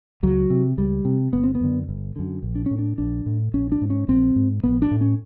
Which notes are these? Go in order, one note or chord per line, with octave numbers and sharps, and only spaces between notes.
C#2 F#3
C3
C#2 G3
C3
G1 B3
C4
B3
F#2 D3
G1
F#2 D3
A#1
D4
C#4
A2
D4
A#1 D4
A2
A#1 C#4
D4
G#2
C#4
A#1 C4
G#2
A#1 B3
D4
A2
C#4